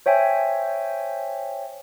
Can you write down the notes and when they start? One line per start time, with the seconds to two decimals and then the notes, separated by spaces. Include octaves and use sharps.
0.06 C5 C#5 E5 G5 G#5